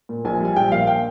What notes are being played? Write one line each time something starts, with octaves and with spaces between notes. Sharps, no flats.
A#2
A#1 G#5
G3 G#5
A#1 G5
A#2 F5
G5